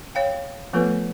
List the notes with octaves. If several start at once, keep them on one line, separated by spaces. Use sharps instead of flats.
C#5 F5 G5
F3 A3 B3 F4 A4 B4